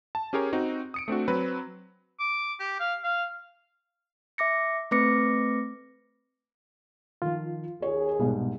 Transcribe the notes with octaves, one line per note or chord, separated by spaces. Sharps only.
A5
C#4 G4 G#4 A#4 C#5
C4 D#4 F#4
D#6 C#7 D7
A3 C4 D4 F#4
F#3 C4 B4
D6
G4
F5
F5
E5 D6 A#6 C#7
A3 C4 B4 D6 A#6 C#7
D#3 F3 F4
D#2 G#4 C#5
C2 G#2 B2 B3